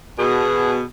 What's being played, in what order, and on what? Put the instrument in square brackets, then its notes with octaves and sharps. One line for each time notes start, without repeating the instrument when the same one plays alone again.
[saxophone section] B2 G#4